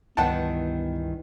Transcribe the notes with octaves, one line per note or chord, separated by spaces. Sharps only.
C#2 G2 D#3 E3 B3 F#5 G5 A5